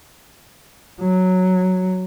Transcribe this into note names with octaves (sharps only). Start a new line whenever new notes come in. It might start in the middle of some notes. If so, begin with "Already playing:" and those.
F#3